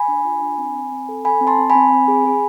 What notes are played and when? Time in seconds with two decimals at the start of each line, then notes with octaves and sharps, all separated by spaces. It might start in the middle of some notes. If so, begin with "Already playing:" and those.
Already playing: G#5 B5
0.08 D4
0.25 F4
0.42 D4
0.58 C4
0.76 C4
0.92 C4
1.09 A4
1.25 A4 G#5 B5
1.41 C4
1.47 A5 C6
1.58 C4
1.70 G#5 B5
1.75 C4
1.92 C4
2.08 G#4
2.25 G#4